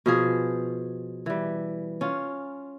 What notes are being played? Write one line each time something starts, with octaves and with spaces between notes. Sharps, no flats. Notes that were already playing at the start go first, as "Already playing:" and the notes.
B2 F3 G#4
E3 G3
C#4 F4